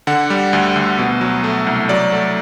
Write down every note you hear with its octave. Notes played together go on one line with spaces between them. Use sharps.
D3 F#5
G3
D2
D2
B2
F#3
A3
C2
F#3 D5
A3